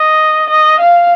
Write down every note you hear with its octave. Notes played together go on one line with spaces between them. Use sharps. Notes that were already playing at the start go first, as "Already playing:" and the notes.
Already playing: D#5
D#5
F5